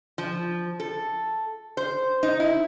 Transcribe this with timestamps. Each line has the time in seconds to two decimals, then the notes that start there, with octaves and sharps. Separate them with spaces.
0.18 F3
0.80 A4
1.77 C5
2.23 D#4
2.40 E4